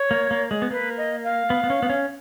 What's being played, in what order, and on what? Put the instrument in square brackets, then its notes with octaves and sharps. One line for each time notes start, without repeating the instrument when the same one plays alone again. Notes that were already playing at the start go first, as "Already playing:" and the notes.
Already playing: [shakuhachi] C#5
[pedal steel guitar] A#3
A#3
G#3
B3
[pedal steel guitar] A#3 [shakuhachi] B4
[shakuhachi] D#5
F5
[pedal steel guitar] B3
B3
C#4
B3
C#4